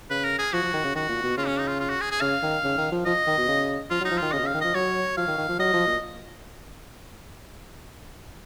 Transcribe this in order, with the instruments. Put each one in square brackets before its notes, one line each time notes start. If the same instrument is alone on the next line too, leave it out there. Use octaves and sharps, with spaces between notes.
[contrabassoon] C#3 [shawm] B4
[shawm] A#4
G#4
[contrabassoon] F3 [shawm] F#4
[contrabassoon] F3
D#3
C#3
[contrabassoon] D#3 [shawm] F#4
[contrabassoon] A#2
B2
[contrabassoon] C#3 [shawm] F4
[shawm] C#4
D#4
F4
F4
F#4
G#4
G#4
[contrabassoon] C#3 [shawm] F5
[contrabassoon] D#3
C#3
D#3
F3
[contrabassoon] F3 [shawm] D#5
[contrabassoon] D#3
B2
C#3
[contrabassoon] F3 [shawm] F4
[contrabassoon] F#3
[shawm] D#4
[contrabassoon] F3
[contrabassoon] D#3 [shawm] F4
[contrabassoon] C#3 [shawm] D#5
[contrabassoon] B2
C#3
[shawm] F5
[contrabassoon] D#3
[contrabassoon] F3 [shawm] D#5
[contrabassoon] F#3 [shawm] C#5
[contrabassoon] F3 [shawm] F5
[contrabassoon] D#3
D#3
F3
[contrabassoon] F#3 [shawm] D#5
[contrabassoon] F3
A#2